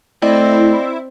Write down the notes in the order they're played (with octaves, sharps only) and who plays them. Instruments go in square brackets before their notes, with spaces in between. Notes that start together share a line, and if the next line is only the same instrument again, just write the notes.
[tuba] A3 [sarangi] C4 [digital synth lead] E4 [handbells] D5 D#5 G5